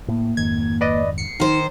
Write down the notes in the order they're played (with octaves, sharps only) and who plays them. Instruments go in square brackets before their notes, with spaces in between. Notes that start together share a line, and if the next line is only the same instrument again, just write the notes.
[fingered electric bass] A2 [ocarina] A#3
[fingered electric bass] F2 G#2 D#3 [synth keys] G#6
[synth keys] B4 D5 D#5
C7 C#7
[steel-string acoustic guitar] D#3 C5 [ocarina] D#4